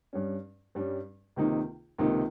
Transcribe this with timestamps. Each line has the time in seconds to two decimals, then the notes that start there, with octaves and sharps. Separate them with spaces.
0.13 G2 G3 C#4
0.75 G2 G3 C#4
1.36 C#2 C3 D#3 A#3 D#4
1.98 C#2 C3 D#3 A#3 D#4